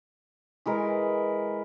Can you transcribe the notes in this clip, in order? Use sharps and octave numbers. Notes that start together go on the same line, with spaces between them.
E3 G#3 A#4 B4